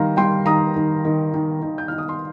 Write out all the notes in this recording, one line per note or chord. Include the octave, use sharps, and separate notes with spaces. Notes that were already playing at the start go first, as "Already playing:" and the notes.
Already playing: D#3 G3 F5 A#5 C6
G3 G5 C6
D#3 A#5 D#6
D#3
D#3
D#3
D#3
G6
D#4 F6
D#6
C6